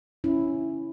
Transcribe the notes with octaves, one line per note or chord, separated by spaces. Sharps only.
C#4 E4